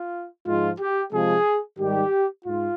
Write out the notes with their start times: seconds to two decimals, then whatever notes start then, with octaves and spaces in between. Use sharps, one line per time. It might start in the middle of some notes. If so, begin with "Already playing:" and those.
Already playing: F4
0.46 G#2 F3 G#3 F4
0.80 G4
1.13 C3 F3 G#3 G#4
1.79 G#2 D#3 G3 G4
2.45 G#2 F4